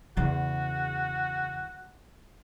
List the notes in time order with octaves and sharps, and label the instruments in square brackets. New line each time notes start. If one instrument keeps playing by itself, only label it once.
[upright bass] E2 C#3 [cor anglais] F#4